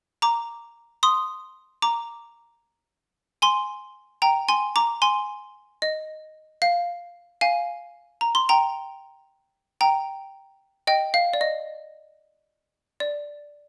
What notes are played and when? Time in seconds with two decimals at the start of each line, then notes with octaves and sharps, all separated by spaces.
0.22 A#5 D6
1.03 C6 D#6
1.82 A#5 D6
3.42 G#5 C6
4.22 G5 A#5
4.49 G#5 C6
4.76 A#5 D6
5.02 G#5 C6
5.82 D#5
6.62 F5
7.41 F5 G#5
8.21 A#5
8.35 C6
8.49 G5 A#5
9.81 G5 A#5
10.87 D#5 G5
11.14 F5
11.34 D5
11.41 D#5
13.00 D5